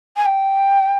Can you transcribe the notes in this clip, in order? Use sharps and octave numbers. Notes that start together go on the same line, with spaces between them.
G#5
G5